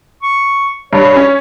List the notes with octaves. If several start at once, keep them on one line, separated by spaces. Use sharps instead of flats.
C#6
G2 C#5
C#4